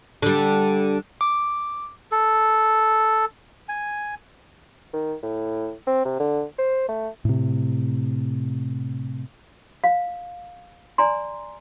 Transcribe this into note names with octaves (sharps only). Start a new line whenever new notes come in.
D3 G3
D6
A4
G#5
D#3
A2
C4
C3
D3
C5
A3
A2 C3
F5
D5 G#5 A#5 C6